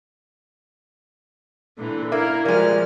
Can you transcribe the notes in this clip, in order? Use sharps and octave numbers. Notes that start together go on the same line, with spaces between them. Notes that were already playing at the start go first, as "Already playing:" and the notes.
A#2 D3 E3
A#3 E4 A#4
A#2 F3 G3 G#3 F#4 F6